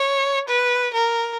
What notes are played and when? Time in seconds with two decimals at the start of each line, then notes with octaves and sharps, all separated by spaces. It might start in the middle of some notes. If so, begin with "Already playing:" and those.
Already playing: C#5
0.47 B4
0.93 A#4